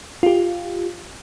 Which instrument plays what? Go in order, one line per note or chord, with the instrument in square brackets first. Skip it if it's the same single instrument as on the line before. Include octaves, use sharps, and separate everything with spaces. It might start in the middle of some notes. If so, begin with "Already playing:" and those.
[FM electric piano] F4 G4